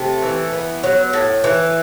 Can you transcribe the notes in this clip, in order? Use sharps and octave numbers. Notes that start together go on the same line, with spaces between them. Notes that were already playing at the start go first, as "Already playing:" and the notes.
Already playing: C3 A3
E3
B3
F#3
A2
E3